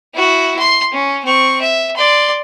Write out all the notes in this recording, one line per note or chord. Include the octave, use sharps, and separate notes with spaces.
E4 F#4
C6
C#4
C4 C#6
E5
D5 C6